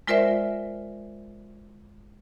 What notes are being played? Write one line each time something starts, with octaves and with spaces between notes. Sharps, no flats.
G#3 F4 A#4 C5 D5 E5